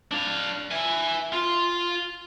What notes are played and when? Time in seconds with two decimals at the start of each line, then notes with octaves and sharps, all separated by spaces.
0.11 D4 F5
0.71 E5 G#5
1.32 F4